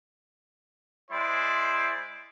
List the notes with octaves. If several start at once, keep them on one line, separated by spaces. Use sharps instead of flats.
G#3 E4 C5 D5